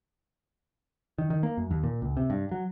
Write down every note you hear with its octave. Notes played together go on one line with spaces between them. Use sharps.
D#3
D#3
A#3
F#2
D#2
A#2
C#2
C3
G2
F#3